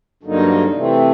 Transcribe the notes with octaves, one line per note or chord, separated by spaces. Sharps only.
G2 D3 F#3 A#3 D#4
C3 E3 A3 C4